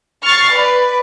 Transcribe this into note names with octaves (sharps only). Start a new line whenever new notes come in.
C#6 F6 A6 C7
B4 D5